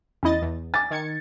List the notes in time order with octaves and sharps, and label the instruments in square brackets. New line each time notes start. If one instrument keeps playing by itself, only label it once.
[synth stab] E2 D#5 A6 [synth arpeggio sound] C#4 E4
[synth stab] E2
[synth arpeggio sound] G#5 D6 [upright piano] A6
[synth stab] D#3 G#6 C#7